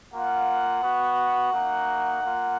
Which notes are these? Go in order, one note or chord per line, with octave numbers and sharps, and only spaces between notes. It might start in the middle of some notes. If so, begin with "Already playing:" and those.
A#3 F4 F#5
B3 F#4
A#3 D#4 F#4
A#3 F4